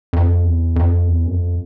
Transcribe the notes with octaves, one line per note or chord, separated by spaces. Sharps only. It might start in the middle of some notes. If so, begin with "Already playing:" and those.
F2
E2
F2
E2
F#2
F2